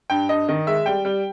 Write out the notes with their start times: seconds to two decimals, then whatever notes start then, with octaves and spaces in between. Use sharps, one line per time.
0.10 G2 G5
0.29 G2 D#5
0.49 D#3 D#5
0.67 G#3 E5
0.86 G3 G5
1.05 G3